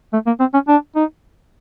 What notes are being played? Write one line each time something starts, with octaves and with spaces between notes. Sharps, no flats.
A3
A#3
C4
C#4
D4
D#4